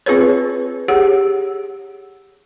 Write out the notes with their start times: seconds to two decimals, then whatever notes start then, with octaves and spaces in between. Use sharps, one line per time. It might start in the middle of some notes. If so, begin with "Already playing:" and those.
0.06 C4 F4 G#4 B4 C#5
0.88 G4 G#4 C#5 F#5